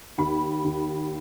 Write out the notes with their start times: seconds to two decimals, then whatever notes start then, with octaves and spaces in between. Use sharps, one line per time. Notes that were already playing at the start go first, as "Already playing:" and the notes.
0.18 D#2 B5
0.64 D#2